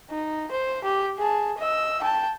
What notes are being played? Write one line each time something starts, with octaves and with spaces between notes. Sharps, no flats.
D#4
C5
G4
G#4 A5
D#5 E6
G5 A5